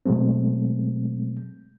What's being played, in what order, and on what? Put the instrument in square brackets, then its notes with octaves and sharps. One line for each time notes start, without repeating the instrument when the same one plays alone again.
[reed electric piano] B2 F#3 G#3 A3 C4